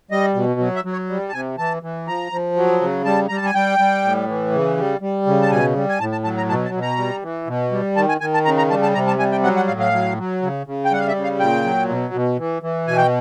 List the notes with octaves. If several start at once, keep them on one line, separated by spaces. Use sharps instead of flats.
G3 D#5
B2
F#3
E5
F#3
C#5
G3
A5
C3 G#5
E3 A5
E3
F3 A#5
F3
F#3
C#3
G3 A5
G3 A#5
A5
G#5
G3 G5
G3
A2
E3
C#3
G3
G3
C#3
A5
B2 G#5
G3
G#5
A2 A5
A5
F#3 A5
A#5
B2 A5
A5
B2
A#5
G3
E3
B2
G3
D#3 A5
G#5
D#3 G#5
A5
C#3 A#5
A#5
G3 A5
A5
C3 A#5
A5
G3 G#5
G5
F#3 F#5
F#5
A2 F5
F5
F#3
F#3
C#3
C#3
G5
G3 F#5
F5
E5
C#3
F5
A#2 G5
F#3
B2
B2
E3
E3
B2 G#5
G5